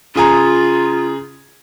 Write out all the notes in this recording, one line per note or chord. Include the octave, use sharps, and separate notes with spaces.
C#3 F4 G#4 A#5